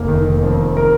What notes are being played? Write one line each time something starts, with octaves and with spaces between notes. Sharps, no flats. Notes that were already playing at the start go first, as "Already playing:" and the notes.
Already playing: F1 A#3
D#3
F2
A#4